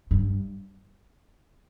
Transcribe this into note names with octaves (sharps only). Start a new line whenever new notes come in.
G2